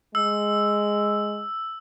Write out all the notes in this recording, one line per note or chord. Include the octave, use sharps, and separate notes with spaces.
G#3 E6